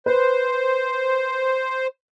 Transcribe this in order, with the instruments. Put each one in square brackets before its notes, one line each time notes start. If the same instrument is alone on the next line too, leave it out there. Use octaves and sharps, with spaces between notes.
[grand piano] B4 [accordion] C5